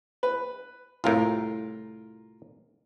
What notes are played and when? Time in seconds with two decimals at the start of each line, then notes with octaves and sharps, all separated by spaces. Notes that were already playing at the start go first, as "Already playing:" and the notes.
0.23 B4
1.04 C2 A2 F4 A#4